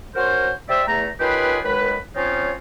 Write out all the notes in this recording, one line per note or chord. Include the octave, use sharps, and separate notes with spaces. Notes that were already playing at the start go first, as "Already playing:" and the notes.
C#4 F#4 A#4 C5
G4 C5 D5 E5
E2 A3 A#5
D#3 C#4 F4 G4 G#4 B4
F#2 D#3 G#3 B4
F3 C4 C#4 D#4 F4 C#5